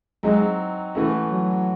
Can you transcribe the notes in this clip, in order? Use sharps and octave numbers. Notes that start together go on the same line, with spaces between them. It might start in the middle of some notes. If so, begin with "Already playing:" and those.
F#3 G#3 C4 D#4
E3 A3 C#4 F#4
F#3